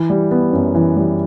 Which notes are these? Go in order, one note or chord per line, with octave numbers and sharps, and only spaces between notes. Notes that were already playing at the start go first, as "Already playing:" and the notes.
Already playing: E3
G3
B3
F#2
E3
G3